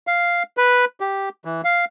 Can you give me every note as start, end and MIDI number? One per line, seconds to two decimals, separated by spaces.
0.07 0.43 77
0.57 0.85 71
1.00 1.29 67
1.45 1.61 52
1.64 1.85 77